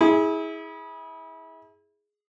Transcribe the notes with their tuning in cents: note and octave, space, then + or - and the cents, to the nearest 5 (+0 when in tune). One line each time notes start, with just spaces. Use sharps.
E4 -30 G#4 +0